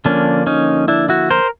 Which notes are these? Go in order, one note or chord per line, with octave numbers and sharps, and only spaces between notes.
D3 F3 A#3 C#4 D4
C#4 D#4
D4 E4
E4 F#4
A#4 C5